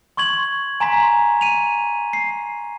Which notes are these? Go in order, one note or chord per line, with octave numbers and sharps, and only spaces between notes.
C6 C#6 G#6 F#7
G#5 A#5 C6 B6
D#7 F7
C7